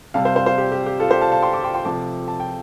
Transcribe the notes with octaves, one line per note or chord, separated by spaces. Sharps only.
C3 G3 F5 A5
C5 F5
C5 F5
C5 F5
G4
G4
G4
F4 A4
G4 C5
F5 A5
F5 A5
G5 C6
A5 D6
G5 C6
G5 C6
C3 F3 A3 A5 D6
A5
G5